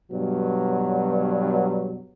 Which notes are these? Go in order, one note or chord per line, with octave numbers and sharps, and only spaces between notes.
G2 B2 F#3